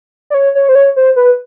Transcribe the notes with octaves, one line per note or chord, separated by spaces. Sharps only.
D5
C#5
C#5
C5
C#5
C5
B4